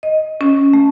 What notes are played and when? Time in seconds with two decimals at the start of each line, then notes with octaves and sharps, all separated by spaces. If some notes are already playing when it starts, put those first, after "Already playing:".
0.03 D#5
0.41 C#4
0.73 A3